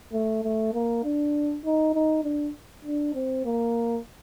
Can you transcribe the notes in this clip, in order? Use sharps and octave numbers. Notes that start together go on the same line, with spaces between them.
A3
A3
A#3
D4
D#4
D#4
D4
D4
C4
A#3